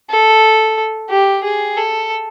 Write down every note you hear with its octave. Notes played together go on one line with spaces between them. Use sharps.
A4
G4
G#4
A4